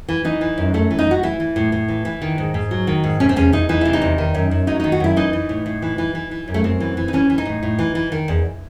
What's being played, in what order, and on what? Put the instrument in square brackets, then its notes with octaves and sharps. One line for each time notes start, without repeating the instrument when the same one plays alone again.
[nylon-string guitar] E3
E3 D#4
E3
F#2
F#2 A3
E3
D#4
E3 F#4
E3 E4
E3
A2
A2
E3
E3
D#3
G#2
G#2
F#3
D#3
G#2
C3 C#4
C4
E2 C#4
E2 D#4
E3 D#4
C3 E4
D#4
E2
D#3
F#2
F#2
F#3 D#4
D#3 D#4
F#4
F#2 E4
E3 D#4
E3
A2
A2
E3
E3
E3
E3
F#2
A3
F#2 C4
E3
E3
D#4
E3 C#4
E3
D#4
A2
A2
E3
E3
D#3
E2